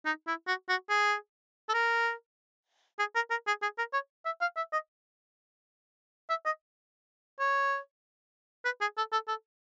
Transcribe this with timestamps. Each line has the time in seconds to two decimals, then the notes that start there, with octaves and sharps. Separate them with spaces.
0.05 D#4
0.27 E4
0.47 F#4
0.69 F#4
0.89 G#4
1.69 A4
1.74 A#4
2.99 G#4
3.15 A#4
3.30 A#4
3.47 G#4
3.62 G#4
3.78 A#4
3.93 C#5
4.25 E5
4.41 F5
4.57 E5
4.73 D#5
6.29 E5
6.46 D#5
7.39 C#5
8.65 B4
8.81 G#4
8.97 A4
9.13 A4
9.28 A4